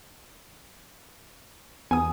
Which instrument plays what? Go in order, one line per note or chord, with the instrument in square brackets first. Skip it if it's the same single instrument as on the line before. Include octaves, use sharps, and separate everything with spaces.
[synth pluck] E2 B3 D#6 [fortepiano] G#5